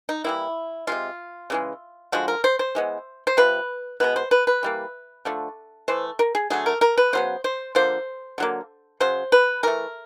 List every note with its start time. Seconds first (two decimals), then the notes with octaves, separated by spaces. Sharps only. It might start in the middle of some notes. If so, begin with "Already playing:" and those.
0.09 D#4
0.24 E3 G3 A#3 E4
0.87 C3 D#3 G#3 F4
1.50 C#3 E3 G#3
2.12 D3 F3 G#3 F#4
2.28 A#4
2.44 C5
2.59 C5
2.75 E3 G#3 B3
3.27 C5
3.37 C3 F3 B4
4.00 B2 G#3 B3 B4
4.16 C5
4.31 B4
4.47 B4
4.63 E3 G3 A#3
5.25 D3 F3 A3
5.88 E3 A3 C5
6.19 A#4
6.35 G#4
6.50 D3 F#3 A3 G#4
6.66 A#4
6.81 A#4
6.97 B4
7.13 C#3 F#3 B3 C5
7.44 C5
7.75 D3 F3 A#3 C5
8.38 D3 F#3 A#3
9.00 C#3 F#3 C5
9.32 B4
9.63 E3 A3 A#4